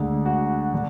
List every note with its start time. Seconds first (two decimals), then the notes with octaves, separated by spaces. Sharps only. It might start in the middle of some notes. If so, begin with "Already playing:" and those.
Already playing: D2 D3 G#3
0.26 F#4
0.74 D3